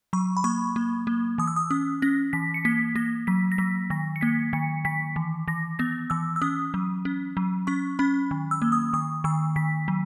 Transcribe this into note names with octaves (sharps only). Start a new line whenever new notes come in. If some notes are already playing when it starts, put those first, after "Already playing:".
F#3 C#6
B5
A#3 C#6
A#3
A#3
E3 D#6
E6
D#6
C#4 D#6
C#4 A#6
E3 B6
C#7
A#3 B6
A#3 A#6
F#3 B6
A#6
F#3 B6
D#3 A#6
C#7
A#3 B6
D#3 C#7
D#3 B6
E3
E3 A#6
B3 A#6
E3 E6
E6
C#4 D#6
F#3
C#4
F#3
C#4 C#6
C#4 B5
D#3
E6
A#3
D#6
D#3 D#6
D#3 E6
D#3 B6
F#3